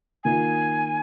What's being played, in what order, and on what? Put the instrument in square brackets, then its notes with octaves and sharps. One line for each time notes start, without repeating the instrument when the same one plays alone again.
[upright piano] D#3 A#3 F4 A#4 [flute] G#5